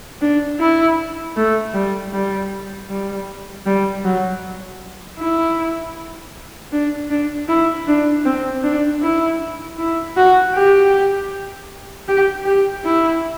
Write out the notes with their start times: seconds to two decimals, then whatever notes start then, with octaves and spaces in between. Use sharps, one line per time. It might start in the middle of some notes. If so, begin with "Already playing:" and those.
0.21 D4
0.59 E4
1.37 A3
1.74 G3
2.13 G3
2.90 G3
3.66 G3
4.04 F#3
5.18 E4
6.72 D4
7.10 D4
7.48 E4
7.87 D4
8.25 C4
8.63 D4
9.02 E4
9.79 E4
10.17 F#4
10.55 G4
12.08 G4
12.45 G4
12.85 E4